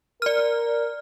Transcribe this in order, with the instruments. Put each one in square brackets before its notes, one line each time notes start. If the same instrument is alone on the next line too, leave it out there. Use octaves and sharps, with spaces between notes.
[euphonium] A#4 [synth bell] D5 F6